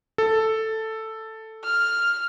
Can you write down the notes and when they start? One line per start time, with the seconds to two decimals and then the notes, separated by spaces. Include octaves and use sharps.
0.18 A4
1.64 F6